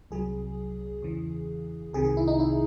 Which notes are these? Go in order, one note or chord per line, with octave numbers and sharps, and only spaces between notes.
C2 C3 F#3 G#4
E2 C#3 E3
C2 C3 D#3 G#4
G#4
E4
D#4
E4